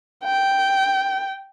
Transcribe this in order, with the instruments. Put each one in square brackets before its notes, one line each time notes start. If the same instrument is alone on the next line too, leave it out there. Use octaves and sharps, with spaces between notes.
[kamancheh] G5